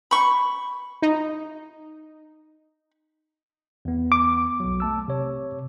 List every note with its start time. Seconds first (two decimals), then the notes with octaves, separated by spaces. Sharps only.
0.11 B5 C#6
1.02 D#4
3.85 E2 B3
4.12 D6
4.60 B1 F#3
4.80 A3 A5 E6
5.08 C3 C#5